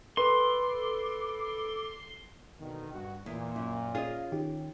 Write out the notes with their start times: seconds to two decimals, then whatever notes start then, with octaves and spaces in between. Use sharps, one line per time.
0.17 A4 B4 C6 D6
2.61 B2 D3 D#3
2.93 G2 F#4
3.26 E2 A#2
3.56 F#2
3.95 C#4 F4 G#4 D#5 F5
4.32 D#3 G4